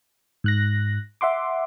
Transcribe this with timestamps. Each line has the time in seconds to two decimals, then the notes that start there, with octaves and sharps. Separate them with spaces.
0.44 G#2 F#6 A#6
1.21 E5 F#5 C6 D6